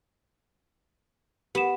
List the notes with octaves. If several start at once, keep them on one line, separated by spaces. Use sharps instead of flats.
B3 G4 E7